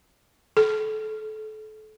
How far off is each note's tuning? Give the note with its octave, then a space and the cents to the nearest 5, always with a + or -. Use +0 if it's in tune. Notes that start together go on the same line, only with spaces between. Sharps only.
A4 -30